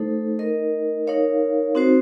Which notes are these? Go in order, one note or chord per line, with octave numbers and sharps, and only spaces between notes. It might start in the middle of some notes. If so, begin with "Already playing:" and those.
Already playing: A3 D#4 A4 C5
D#4 A#4 D#5
D#4 A#4 C#5 F5
C4 D#4 F#4 C5